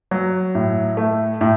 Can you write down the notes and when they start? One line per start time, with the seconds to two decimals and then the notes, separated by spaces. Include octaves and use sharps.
0.11 F#3
0.55 A2
0.97 A3
1.41 A2